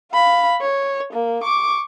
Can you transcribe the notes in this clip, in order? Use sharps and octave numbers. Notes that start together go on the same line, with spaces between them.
F5 B5
C#5
A#3
C#6 D6